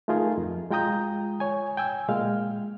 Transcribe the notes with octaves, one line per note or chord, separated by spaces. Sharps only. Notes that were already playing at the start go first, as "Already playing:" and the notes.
A3 D#4 F4 G#4 A#4
F2
G#3 F4 G5 A#5 D#6 G6
C#5 G#5
G5 G#5 E6
A#2 G#3 F5 F6